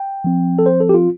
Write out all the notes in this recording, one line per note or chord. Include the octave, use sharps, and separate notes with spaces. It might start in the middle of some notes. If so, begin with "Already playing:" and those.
Already playing: G5
F3 C4
A4
C5
A4
G4
F4